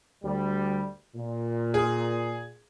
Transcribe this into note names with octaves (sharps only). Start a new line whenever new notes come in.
D2 G3
A#2
G#4